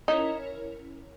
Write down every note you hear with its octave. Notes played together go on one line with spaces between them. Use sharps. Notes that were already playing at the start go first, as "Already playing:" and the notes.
C#4 D#4 E4 A#4 C#5